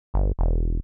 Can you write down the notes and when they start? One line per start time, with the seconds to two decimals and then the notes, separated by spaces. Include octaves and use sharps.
0.14 G1
0.39 E1